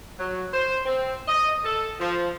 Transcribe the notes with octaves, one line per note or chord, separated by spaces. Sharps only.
F#3
C5
C4
D#5
A4
F3